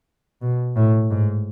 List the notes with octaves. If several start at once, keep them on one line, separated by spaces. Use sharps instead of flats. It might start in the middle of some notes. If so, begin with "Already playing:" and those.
B2
A2
G#2